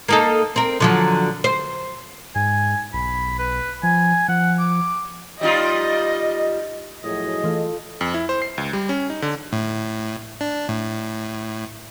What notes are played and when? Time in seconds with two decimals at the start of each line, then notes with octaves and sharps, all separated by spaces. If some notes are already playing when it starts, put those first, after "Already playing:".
0.08 A#3 D#4 A4
0.56 C4 A#4
0.80 D3 F3 F#3
1.44 C5
2.36 G#2 G#5
2.93 B1 B5
3.39 B4
3.83 F3 G#5
4.28 F3 F#5
4.59 D6
5.41 G3 D#4 F4 D#5
7.04 F#2 A2 F3 F#3 G#4 D#5
7.44 E3 A3 F4 A4
8.01 F2
8.14 E4
8.29 C5
8.42 C7
8.58 C#2
8.73 G3
8.89 C#4
9.10 D#4
9.22 D3
9.53 A2
10.41 D4
10.69 A2